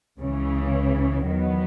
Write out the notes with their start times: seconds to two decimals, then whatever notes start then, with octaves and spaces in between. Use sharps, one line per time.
0.17 C#2 C#3 E3
1.24 E2 D#3 F#3 B3